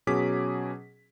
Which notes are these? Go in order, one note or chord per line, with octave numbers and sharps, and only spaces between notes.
B2 F#3 C#4 G#4 D6 B6